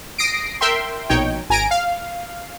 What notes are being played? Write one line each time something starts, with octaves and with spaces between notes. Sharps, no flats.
D#6 A#6 C7 D7
A#4 E5 G5 C6
A#1 B2 D#4 C#5 G5
G#1 G#5 A#5 A#6 D7
F5